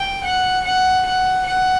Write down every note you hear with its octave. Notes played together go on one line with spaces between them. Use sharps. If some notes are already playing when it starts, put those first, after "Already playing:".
Already playing: G5
F#5
F#5
F#5
F#5